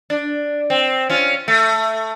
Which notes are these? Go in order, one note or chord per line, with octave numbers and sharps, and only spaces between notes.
D4
C4
C#4 F4
A3